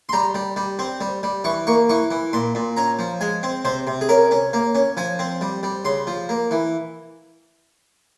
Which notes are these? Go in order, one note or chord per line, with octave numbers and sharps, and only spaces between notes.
C6
G3 A#5
G3
G3
C4
G3
G3
E3 C#6
A#3 C#6
E3 C#6
E3
A#2 C6
A#2
C#4 A#5
F3
G#3 G#5
C4
C3 C5
C3
G#4
C#4 A#4
C#4
A#3
C#4
F3 G#5
C4
G3
G3
C#3 C6
F3
A#3
E3